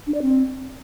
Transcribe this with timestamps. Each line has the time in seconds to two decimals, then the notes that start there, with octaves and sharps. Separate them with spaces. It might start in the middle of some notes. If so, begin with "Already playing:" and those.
0.07 D4
0.14 D5
0.22 C4